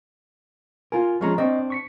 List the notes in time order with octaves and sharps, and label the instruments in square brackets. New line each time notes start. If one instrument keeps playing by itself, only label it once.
[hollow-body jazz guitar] F4 A#4 [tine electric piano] G#5
[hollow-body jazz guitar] F3 G#3 C#4 [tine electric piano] A#5 C#6 F6
[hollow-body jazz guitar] C4 D4 [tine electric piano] D#5 C#6
[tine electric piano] C#6 B6 C#7